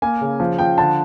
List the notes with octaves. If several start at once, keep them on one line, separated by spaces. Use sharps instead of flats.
A#3 G#5
C#3
F3
F3 G5
D3 A5